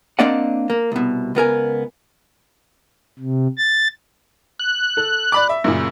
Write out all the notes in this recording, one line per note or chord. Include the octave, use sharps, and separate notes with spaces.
A#3 C4 D4 D5 D#5 F#5
A#3
C2 B2
C#2 B3 A#4 G#5
C3
A6
F#6
A4
D5 B5 D6
E5
F#2 A#2 C#3